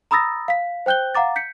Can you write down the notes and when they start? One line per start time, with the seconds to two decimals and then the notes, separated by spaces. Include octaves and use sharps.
0.11 A#5 B5 D#6 E6 A6 A#6
0.48 F5 B6
0.86 C5 G5 F#6 G6 G7
1.15 F5 F#5 A#5 D6 A6
1.36 G6 B6 C#7